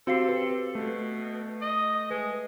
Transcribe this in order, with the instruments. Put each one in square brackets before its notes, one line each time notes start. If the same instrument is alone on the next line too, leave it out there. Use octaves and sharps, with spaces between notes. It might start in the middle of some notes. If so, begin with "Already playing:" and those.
[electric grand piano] C4 G4 [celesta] F#4 F5 C7 [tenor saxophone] A4
[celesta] B4
[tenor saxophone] B2 [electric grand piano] A3
[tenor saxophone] D#5
[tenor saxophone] G#3 [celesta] B4